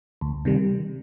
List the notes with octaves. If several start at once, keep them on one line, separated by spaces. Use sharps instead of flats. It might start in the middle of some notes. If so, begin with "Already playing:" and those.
D2
C3 D#3 G3